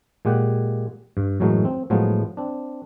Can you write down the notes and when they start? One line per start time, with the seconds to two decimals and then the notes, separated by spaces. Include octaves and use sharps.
0.25 A#2 G#3 G4 F#5
1.17 G2
1.40 F#2 A2 E3 F#3 G#3 A3
1.65 C4
1.90 A2 F3 F#3 G#3 B3
2.37 C4 D4